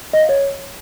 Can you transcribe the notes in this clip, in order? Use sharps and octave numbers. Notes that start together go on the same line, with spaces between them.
D#5
F5
C#5